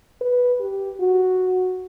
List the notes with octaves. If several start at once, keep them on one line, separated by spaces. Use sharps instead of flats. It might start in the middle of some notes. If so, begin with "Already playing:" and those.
B4
G4
F#4